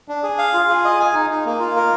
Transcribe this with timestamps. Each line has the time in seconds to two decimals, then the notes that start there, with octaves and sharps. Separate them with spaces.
0.08 D4
0.23 G#4
0.38 F5
0.54 F4
0.69 G#4
0.85 D#5
1.00 G#5
1.14 D#4
1.30 D#4
1.46 A#3
1.60 F4
1.76 A#4